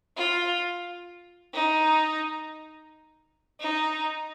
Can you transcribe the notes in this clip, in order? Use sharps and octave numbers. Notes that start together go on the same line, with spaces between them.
F4
D#4
D#4